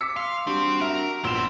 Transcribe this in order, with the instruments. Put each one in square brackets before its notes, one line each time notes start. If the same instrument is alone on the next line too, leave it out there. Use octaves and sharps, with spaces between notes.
[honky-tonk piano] D6 B6 C#7 [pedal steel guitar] E6
[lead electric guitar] F5 [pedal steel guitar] C6
[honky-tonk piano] G3 [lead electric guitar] C4 [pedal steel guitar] D4 F#4
[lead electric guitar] A#4 [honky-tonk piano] E5
[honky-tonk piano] A#1 E7 [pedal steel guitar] B3 B4 E6 [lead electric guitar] C4